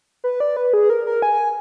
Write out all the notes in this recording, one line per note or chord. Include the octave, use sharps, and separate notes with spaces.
B4
D5
B4
G#4
A#4
A#4
G#5